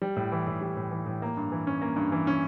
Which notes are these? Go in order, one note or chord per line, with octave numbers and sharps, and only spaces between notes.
G3
A2
E3
A2
G3
A2
E3
A2
A#3
G2
E3
C#4
A#3
G2
E3
C#4